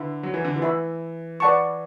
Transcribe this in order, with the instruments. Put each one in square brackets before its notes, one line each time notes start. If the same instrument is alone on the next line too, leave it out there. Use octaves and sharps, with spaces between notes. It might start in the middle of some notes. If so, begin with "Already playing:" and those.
Already playing: [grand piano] D3 [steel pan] E4 B4 E5 B5
[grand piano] F#3
E3
D3
E3
[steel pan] E4 B4 E5 B5
B4 D5 F#5 A5 C#6